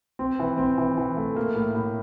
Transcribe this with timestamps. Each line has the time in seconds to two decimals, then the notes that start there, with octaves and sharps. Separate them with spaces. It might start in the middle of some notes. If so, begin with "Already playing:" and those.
0.19 C4
0.39 E3
0.58 C4
0.78 E3
0.98 E3
1.17 A3
1.36 A#3
1.56 A2
1.75 A2